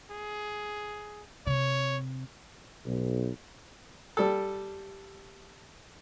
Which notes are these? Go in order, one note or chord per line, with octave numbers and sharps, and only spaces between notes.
G#4
C3 C#5
B1
G3 A4